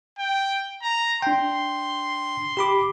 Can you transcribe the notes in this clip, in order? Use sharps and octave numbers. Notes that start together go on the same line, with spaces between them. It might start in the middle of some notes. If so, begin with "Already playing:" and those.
G5
A#5
D4 G5 C6
G4 B5 D6